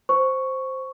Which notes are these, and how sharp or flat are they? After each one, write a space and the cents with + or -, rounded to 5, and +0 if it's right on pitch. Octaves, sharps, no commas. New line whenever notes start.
C5 +0 C#6 +0